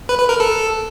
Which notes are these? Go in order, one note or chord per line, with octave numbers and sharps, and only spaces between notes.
B4
B4
A#4
A4